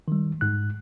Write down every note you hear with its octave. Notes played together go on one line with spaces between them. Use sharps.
D#3 G3
G#2 F#6